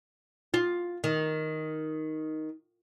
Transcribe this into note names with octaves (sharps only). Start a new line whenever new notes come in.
F4
D#3